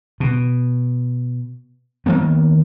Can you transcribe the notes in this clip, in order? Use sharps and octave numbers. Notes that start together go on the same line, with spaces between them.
B2
D#3 F#3 A#3 B3